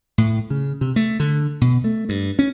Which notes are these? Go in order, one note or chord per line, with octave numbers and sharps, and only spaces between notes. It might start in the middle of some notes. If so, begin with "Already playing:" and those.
A2
C#3
C3
A3
D3
B2
A3
G2
C#4